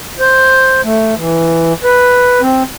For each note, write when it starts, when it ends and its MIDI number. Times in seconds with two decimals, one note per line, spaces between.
0.20 0.81 72
0.84 1.14 57
1.17 1.73 52
1.84 2.41 71
2.41 2.63 60